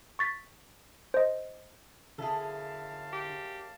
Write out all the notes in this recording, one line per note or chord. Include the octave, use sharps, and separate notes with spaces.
C#6 A6 B6
C5 D#5
F#2 D3 E4 G#4 A4 F5 A5
G4